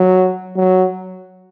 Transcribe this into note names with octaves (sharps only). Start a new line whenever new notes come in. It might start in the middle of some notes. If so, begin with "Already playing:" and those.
Already playing: F#3
F#3